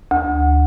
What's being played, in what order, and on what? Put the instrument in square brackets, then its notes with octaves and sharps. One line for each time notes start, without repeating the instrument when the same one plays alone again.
[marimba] D2